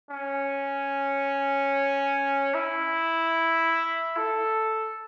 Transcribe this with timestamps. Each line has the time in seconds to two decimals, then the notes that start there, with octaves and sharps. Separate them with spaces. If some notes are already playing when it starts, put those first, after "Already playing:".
0.10 C#4
2.54 E4
4.17 A4